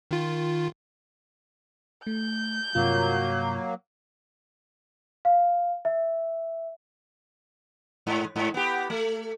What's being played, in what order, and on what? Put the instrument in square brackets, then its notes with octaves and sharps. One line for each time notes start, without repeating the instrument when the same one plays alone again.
[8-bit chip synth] D#3 F4
[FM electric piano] A3 [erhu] G6
[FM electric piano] G2 C3 F4 [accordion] F#3 A#3
[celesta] F5
E5
[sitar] G#2
G#2
B3 G4
A3